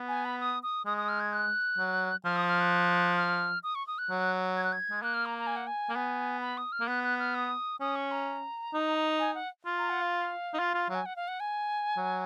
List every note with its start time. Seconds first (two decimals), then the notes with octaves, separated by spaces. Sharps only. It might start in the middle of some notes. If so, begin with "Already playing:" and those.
Already playing: B3
0.08 G#5
0.25 B5
0.40 D#6
0.63 D#6
0.86 G#3 D#6
0.97 D#6
1.09 F6
1.20 G#6
1.33 F#6
1.78 F#3
2.24 F3 F6
2.36 D#6
2.48 F6
2.60 F#6
3.17 F6
3.63 D#6
3.75 C#6
3.87 D#6
3.98 F#6
4.10 F#3
4.57 G#6
4.64 F#6
4.72 G#6
4.91 G#3
5.03 A#3 F#6
5.14 F6
5.26 A#5
5.38 A#5
5.47 G#5
5.56 F#5
5.67 G#5
5.89 A#3
5.95 B3 G#5
6.41 B5
6.57 D#6
6.72 F6
6.81 A#3
6.88 B3 F#6
7.03 F#6
7.19 F6
7.34 D#6
7.81 C#4 D#6
7.96 C#6
8.12 A#5
8.74 D#4
9.19 G#5
9.35 F#5
9.66 F4
9.78 A#5
9.90 F#5
10.01 F5
10.54 D#4
10.59 F4
10.75 F4
10.89 F#3
10.95 G#5
11.06 F#5
11.16 F5
11.28 F#5
11.40 G#5
11.97 F#3